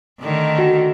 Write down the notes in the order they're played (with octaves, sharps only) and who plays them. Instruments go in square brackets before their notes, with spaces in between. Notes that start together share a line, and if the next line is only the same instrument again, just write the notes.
[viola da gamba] D3 D#3 A3
[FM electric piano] F#4